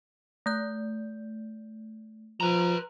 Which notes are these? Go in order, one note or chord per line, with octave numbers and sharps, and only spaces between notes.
A3 G6
F3 B4 A#5